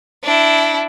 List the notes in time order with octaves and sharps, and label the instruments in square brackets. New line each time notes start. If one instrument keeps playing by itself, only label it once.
[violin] D4 E4